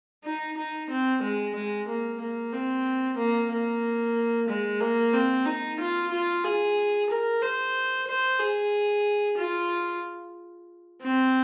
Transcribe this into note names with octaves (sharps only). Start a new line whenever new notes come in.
D#4
D#4
C4
G#3
G#3
A#3
A#3
C4
A#3
A#3
G#3
A#3
C4
D#4
F4
F4
G#4
A#4
C5
C5
G#4
F4
C4